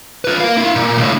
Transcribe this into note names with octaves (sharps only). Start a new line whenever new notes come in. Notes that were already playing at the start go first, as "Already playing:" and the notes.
F4 B4
A#4 F5
E4 F5
A#2
C#2 A2